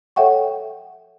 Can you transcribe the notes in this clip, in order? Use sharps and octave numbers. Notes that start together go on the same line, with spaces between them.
A4 C#5 E5 F#5 G5 C#6